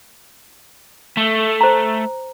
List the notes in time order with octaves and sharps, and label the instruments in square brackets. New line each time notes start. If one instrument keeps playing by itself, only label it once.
[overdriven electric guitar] A3
[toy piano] C5 A#5